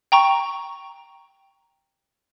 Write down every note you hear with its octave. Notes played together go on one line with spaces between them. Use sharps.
G5 A#5 C#6